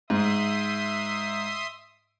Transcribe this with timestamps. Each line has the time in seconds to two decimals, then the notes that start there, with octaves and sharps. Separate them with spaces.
0.10 G#2 E5 C6 D#6